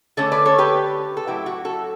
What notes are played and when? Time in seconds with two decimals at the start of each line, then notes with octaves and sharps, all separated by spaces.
0.17 D3 A3 C#4 A4 C#5
0.32 B4 D5
0.45 A4 C#5
0.58 G4 B4
1.17 A4
1.27 A2 F#3 A3 E4 G4
1.46 F#4
1.65 F#4 A4